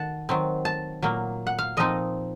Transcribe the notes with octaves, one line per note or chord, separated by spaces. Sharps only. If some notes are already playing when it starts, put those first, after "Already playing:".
Already playing: D#3 F#5 A5
D#3 F#3 C4
A5
A#2 F#3 A#3
F#5
F5
A#2 F3 C4 D#4 D#5